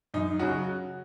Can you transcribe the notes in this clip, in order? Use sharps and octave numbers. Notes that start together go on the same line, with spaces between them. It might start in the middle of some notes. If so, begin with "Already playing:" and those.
F#2 D#4
C#3 F#3 F#4